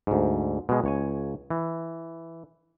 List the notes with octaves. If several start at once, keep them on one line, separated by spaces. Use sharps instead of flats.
D2 G#2
B2 G#3
C#2 C#5 G#5
E3